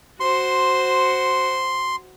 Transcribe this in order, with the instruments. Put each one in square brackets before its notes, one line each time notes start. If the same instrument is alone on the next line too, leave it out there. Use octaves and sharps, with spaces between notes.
[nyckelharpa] F#4 C5 [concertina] C6